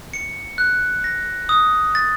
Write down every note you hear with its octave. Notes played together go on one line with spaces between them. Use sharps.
C#7
F#6
A#6
D#6
A6